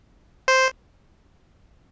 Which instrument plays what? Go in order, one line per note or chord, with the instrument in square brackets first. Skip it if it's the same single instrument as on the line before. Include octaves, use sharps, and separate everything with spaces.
[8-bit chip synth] C5